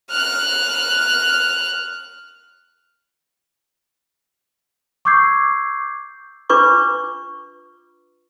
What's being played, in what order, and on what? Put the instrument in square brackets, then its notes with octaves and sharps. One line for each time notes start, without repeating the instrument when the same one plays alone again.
[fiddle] F6 F#6
[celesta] C#6 D6 E6 G6 G#6 C7
[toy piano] D4 F4 B4 C#6 D6